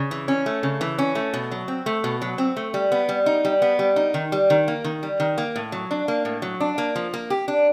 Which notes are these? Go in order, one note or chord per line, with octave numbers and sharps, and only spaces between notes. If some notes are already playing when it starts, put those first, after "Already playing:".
Already playing: C#3
E3
C#4
A3
C#3
E3
C#4
A3
B2
F#3
C4
A3
B2
F#3
C4
A3
G3
B3
G3
D#4
G3
B3
G3
D#4
D#3
G3
D#3
A#3
D#3
G3
D#3
A#3
A2
F#3
D4
A#3
A2
F#3
D4
A#3
F3
A#3
G4
D4